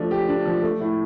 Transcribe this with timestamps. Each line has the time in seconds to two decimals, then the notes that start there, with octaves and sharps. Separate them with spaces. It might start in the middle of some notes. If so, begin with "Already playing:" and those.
Already playing: F3 A3 D4
0.11 G4
0.28 D4
0.45 F3
0.62 A3
0.80 A2